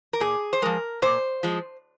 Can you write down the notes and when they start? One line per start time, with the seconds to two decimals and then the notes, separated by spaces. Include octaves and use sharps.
0.13 A#4
0.20 A#2 G#4
0.53 C5
0.62 F3 G#3 A#4
1.02 A#2 C5
1.43 F3 G#3